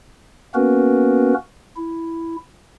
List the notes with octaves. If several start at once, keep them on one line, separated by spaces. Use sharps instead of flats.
A#3 B3 C#4 F#4 A#4 B4
E4